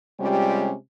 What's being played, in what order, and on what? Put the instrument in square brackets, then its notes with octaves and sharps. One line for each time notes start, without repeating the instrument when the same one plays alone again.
[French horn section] C3 G3 G#3 C#4 F4 G4